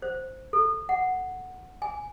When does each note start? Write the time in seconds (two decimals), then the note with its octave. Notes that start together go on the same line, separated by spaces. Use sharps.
0.02 C5
0.53 A4
0.89 F#5
1.82 G#5